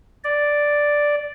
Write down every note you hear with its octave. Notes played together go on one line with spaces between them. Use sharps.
D5